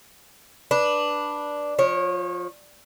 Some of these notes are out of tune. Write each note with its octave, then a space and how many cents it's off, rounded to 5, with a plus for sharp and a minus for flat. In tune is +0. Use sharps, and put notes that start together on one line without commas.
D4 +0 B4 -10
F3 +15 C#5 -25